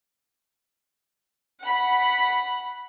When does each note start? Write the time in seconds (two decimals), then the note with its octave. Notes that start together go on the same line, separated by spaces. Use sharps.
1.63 F#5 B5